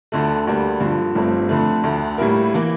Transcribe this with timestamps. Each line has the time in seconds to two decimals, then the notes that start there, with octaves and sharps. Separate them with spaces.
0.12 D2 D3 A3
0.47 D2 D3 G3 A#3 D4
0.80 G2 D3 F3
1.15 G1 G2 F3 A3 C4
1.49 F2 D3 A3
1.84 D2 D3 A3
2.18 A2 G3 A#3 E4 A#4
2.54 E3 A#3